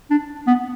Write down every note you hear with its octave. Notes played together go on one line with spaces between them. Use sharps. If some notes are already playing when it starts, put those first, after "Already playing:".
D4
B3